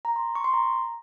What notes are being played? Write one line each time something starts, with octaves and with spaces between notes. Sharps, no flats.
A#5
C6
C#6
C6
A#5